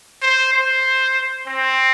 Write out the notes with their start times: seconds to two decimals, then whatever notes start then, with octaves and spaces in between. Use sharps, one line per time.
0.22 C5
0.53 C5
1.48 C4